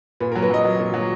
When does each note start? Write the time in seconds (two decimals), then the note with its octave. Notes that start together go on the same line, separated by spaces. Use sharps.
0.20 A#2 B4
0.32 A#4
0.36 F#3
0.42 B4
0.50 F#3 D#5
0.64 F#3
0.80 A#2
0.94 F#3